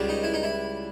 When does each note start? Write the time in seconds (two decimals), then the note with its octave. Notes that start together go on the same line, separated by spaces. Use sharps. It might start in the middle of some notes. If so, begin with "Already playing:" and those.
Already playing: C#2 C#3 G3
0.09 D#4
0.23 E4
0.34 D#4
0.43 E4